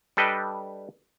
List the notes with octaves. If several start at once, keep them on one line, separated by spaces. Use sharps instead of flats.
G3 D4 A4 B4 D#5 G5